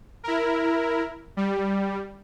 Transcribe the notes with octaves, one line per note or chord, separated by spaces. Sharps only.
E4 A#4
G3